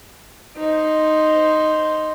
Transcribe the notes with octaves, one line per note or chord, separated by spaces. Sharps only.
D#4 C5